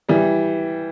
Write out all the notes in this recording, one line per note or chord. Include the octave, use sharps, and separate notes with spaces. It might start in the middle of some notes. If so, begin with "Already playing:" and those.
E3 G3